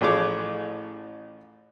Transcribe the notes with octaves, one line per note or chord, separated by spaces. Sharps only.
A1 A2 F3 G#4 C#5 D6